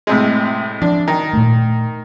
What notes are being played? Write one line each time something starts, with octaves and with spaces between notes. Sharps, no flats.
A2 C3 G#3
F3 D4
D#3
A#2 A3